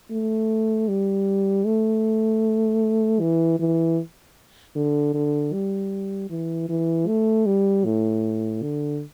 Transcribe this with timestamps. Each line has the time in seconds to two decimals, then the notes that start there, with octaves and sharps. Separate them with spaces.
0.11 A3
0.88 G3
1.66 A3
3.21 E3
3.60 E3
4.76 D3
5.14 D3
5.53 G3
6.30 E3
6.69 E3
7.07 A3
7.46 G3
7.85 A2
8.62 D3